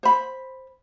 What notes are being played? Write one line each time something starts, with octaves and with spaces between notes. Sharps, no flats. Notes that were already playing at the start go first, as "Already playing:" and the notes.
C5 B5